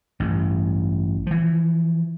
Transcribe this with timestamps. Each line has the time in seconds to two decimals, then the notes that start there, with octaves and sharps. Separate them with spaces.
0.20 A1 G2
1.27 E3 F3